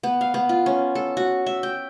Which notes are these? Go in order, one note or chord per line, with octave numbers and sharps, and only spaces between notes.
B3
F5
B3
F4
C#4
A4
F#4
E5
G5